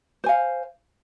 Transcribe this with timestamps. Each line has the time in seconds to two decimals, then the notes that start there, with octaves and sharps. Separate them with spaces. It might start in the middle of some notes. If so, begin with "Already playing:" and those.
0.24 C5
0.26 G#5
0.29 F5